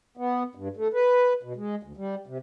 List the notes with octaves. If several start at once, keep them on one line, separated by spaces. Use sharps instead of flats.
B3
G2
A3
B4
B2
G#3
D2
G3
C3